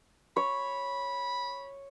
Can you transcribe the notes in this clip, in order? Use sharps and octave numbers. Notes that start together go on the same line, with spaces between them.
C#5 B5